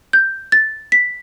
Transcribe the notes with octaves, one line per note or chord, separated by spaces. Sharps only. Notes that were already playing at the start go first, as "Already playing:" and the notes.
G6
A6
B6